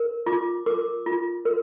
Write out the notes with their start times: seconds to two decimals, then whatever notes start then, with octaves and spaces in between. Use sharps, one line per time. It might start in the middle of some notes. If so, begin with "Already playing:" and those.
Already playing: A#4
0.26 F4 D6
0.66 A#4 D6
1.06 F4
1.45 A#4